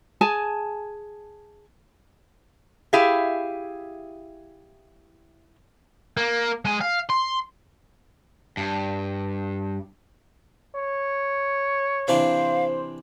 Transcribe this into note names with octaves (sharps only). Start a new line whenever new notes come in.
G#4 G#5 A5
E4 G4 G#4 E5 F5
A#3
G#3 G#5
F5
C6
G2
C#5
C3 E3 D4 C5 F5